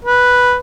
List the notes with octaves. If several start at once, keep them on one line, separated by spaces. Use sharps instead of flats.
B4